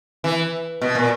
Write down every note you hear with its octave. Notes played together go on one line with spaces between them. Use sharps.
E3
B2
A#2